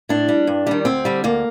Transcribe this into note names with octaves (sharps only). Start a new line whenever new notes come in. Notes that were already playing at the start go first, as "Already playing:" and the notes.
A2 D4
G3
G2
D#3 G3
D2 C4
D3 G3
D2 A#3